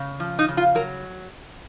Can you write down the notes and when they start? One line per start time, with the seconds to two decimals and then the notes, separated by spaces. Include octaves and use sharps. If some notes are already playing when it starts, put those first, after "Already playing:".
Already playing: C#3
0.20 F3
0.39 D#4
0.48 C#3
0.57 F4
0.75 F#3 A#4